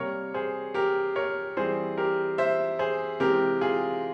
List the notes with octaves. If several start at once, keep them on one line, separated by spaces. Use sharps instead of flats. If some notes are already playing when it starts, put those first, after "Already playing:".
Already playing: C3 G3 A#3 A#4 C#5
G#4 C5
G4 A#4
A#4 C#5
E3 G3 C4 G#4 C5
G4 A#4
C5 E5
G#4 C5
C3 E3 G#3 C4 G4 A#4
F4 G#4